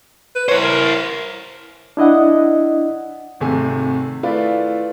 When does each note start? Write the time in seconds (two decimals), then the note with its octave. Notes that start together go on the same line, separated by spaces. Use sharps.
0.35 B4
0.49 E4 C5 C#5
0.63 A#4
1.97 D4 E4 D#5 F#5
3.40 G#1 C3 A3 G#5
4.23 A3 E4 F4 B4 D5 F5